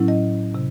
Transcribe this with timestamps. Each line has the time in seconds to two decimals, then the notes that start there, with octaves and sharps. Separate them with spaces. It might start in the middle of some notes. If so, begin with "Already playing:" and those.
Already playing: A2 F#3 C#4 E4
0.08 D#5
0.55 C3